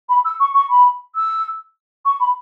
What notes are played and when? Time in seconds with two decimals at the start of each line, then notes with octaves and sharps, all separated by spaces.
0.09 B5
0.25 E6
0.40 C#6
0.54 C#6
0.70 B5
1.15 E6
2.05 C#6
2.20 B5